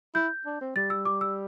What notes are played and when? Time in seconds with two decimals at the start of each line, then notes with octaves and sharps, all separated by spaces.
0.14 E4 G6
0.46 D4
0.61 C4
0.76 G3 A6
0.90 E6
1.05 D6
1.21 E6